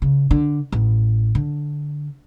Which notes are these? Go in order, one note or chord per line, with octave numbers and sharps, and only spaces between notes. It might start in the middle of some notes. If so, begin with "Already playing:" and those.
C#3
D3
A1
D3